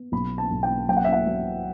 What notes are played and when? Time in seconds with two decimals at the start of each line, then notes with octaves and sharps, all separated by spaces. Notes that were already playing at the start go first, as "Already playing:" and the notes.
Already playing: B3
0.12 B1 B5
0.38 A5
0.51 B1
0.63 G5
0.88 F#3 G5
0.97 F#5
1.04 E5
1.13 F#5
1.27 F#3